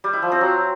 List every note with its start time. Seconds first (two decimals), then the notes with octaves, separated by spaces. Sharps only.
0.04 G3
0.13 E4
0.22 F3
0.32 C4
0.41 F#3